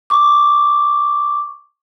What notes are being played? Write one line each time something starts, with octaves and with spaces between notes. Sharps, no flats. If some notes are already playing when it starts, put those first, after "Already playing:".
C#6 D6